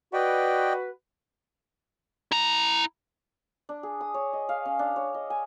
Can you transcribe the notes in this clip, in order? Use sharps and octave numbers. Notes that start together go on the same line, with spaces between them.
F#4 B4 D5 D#5 G5
E4 A#5
D4
G#4
D#6
C#5
D#5
F5
C#4
D4
C#5
D#5
G#5